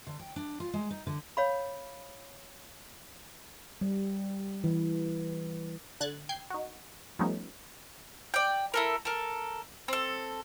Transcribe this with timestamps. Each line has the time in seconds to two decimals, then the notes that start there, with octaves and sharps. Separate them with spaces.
0.07 D3
0.19 G5
0.36 D4
0.60 F4
0.73 G#3
0.91 D#4
1.07 D3
1.37 C#5 F5 B5
3.81 G3
4.64 E3
6.00 D3 F#6 G#6 A6
6.29 G5 G6 G#6 C7
6.50 D#4 F#4
7.19 F3 G3 A3 B3 C#4 D#4
8.34 D5 G5
8.74 E4 A4 A#4
9.05 A4 A#4
9.88 C4 A4